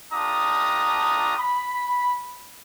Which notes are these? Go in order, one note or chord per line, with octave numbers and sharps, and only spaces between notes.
A3 D4 F4 G4 A#5 D#6
B5